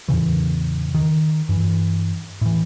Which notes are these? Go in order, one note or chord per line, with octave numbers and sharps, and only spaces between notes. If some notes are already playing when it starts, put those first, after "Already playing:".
E2 A2 C#3 E3
D#3
G2 E3
A2 E3